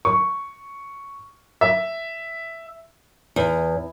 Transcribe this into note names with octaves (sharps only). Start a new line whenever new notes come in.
C#6
E5
E2